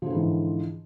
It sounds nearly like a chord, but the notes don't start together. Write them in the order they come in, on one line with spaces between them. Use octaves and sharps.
F3 D3 E3 G#2